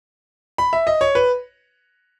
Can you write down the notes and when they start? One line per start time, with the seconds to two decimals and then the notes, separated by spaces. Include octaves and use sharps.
0.58 B5
0.73 E5
0.87 D#5
1.01 C#5
1.15 B4